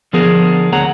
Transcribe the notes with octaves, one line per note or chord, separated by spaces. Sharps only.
D3 F3 B3 D4 G#4 A#4
D2 G#4 C#5 F#5 A#5